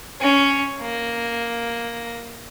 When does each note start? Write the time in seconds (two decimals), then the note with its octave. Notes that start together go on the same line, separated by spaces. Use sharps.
0.21 C#4
0.81 A#3